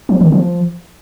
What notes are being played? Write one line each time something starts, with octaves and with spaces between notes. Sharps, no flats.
F3
D#3
F3